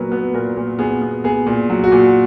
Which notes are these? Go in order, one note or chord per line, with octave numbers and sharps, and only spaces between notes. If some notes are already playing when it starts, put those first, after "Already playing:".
Already playing: A#2 F#3 B3 A#4 B4
B3 B4
A#2 A#4
A#2
B3 G#4
B3
B3 G#4
A#2
F#3
F#4
A#2